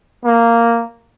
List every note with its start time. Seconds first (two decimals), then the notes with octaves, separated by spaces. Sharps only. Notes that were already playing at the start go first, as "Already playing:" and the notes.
0.25 A#3